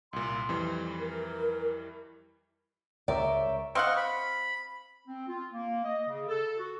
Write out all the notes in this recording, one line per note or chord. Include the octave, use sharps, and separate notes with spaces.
C2 A#2 C6
F2 E3 G3
A#4
C#2 A#4 C#5 D5 E5 G5
C4 D#5 F5 F#5 C#6
B5
C4
F4
A#3
D#5
C#3
A4
F#4